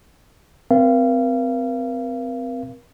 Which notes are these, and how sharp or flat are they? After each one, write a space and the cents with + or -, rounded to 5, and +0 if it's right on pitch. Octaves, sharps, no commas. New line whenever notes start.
C4 -20 A#4 +35 F5 -30